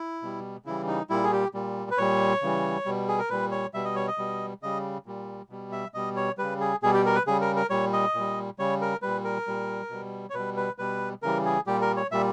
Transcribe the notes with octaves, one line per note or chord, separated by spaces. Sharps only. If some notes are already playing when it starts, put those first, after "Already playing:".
Already playing: E4
B2 G3
C#3 E3 G3 E4
D#4
A#2 G3 E4
G#4
G4
A#2 G3
B4
A#2 G3 C#5
C#3 E3 G3
B2 G3
G#4
A#4
A#2 G3 B4
C#5
B2 G3 E5
D#5
C#5
D#5
B2 G3
C#3 G3 D#5
A#2 G3
B2 G3
E5
B2 G3 D#5
C#5
C#3 G3 B4
G#4
B2 G3 G#4
G4
A#4
B4
C#3 G3 G#4
A#4
A#4
A#2 G3 C#5
D#5
A#2 G3
C#3 G3 C#5
A#4
A#2 G3 B4
A#4
A#2 G3
B2 G3
C#5
B2 G3 B4
B4
B2 G3 B4
C#3 E3 G3 A#4
G#4
A#2 G3 G4
A#4
C#5
A#2 G3 E5